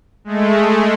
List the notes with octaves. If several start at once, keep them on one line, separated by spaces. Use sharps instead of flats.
G#3 A3